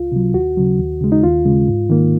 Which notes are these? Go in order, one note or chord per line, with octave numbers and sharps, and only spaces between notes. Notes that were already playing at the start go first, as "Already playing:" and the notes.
Already playing: C#2 F4
C3 F#3
D#2 F#4
C#3 F#3
D#2
C#3 G#3
D#4
D#2 F4
C#3 G#3
G#2
D#3 A#3